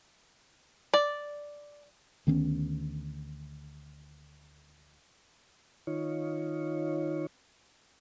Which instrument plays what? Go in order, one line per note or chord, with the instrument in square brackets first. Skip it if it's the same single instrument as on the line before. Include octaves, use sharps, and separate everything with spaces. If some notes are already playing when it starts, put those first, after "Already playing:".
[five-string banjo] D5
[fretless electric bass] D2 D#3 B3 C#4
[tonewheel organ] D#3 D#4 F4 C#5